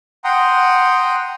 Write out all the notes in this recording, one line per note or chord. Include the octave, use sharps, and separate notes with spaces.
F#5 G5 A#5 C6 D#6